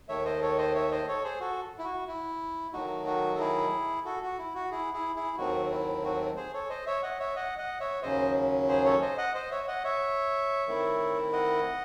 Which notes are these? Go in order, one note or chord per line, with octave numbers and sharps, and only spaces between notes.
D#2 D#3 A3 C#5 E5
C5 D#5
A4 C#5
C5 D#5
C#5 E5
C5 D#5
A4 C#5
G#4 C5
F#4 A4
E4
F#4
E4
D#3 F#3 A3 D#4 F#4
F#4
A4
E4 G#4
F#4 A4
F#4
E4
F#4
E4 G#4
E4 G#4
E4 G#4
D#2 D#3 F#3 A3 C4 F#4
E4
F#4
G#4 C5
A4 C#5
C5 D#5
C#5 E5
D#5 F#5
C#5 E5
D#5 F#5
D#5 F#5
C#5 E5
D#2 C#3 F#3 C#4 C5 D#5
G#4 C5
A4 C#5
C5 D#5
D#5 F#5
C5 D#5
C#5 E5
D#5 F#5
C#5 E5
D#3 A3 C4 E4
D#5 F#5